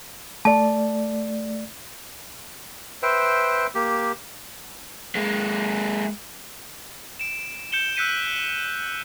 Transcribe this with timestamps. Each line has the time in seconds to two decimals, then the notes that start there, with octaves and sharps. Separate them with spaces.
0.45 A3 D5 A5
3.03 B4 C5 E5 G5
3.75 A#3 G4
5.15 G#3 A#3
7.19 D7 E7
7.72 G6 C#7 E7 G7
7.96 E6 F#6 G6 B6 C#7 D#7